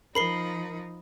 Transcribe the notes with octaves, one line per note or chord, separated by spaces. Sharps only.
F3 D#4 A#4 B5 C7 G7